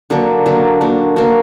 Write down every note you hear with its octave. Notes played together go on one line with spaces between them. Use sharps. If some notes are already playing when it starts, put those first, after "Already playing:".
D3 F#3 A#3 D4
D3 F#3 A#3 D4
A#3 D4 F#4
A#3 D4 F#4